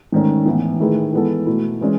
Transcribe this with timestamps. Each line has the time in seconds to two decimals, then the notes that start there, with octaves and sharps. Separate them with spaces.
0.12 G#2 D#3 A3 C#4
0.46 A2 E3 B3
0.79 D#3 A3 E4 G#4 B4
1.13 E3 G#3 B3 E4 A4
1.46 B2 A3 E4
1.81 E3 G#3 C#4